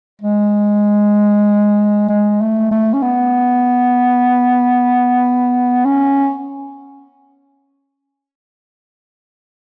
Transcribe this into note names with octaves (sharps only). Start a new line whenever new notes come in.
G#3
G#3
A3
A3
C#4
B3
C#4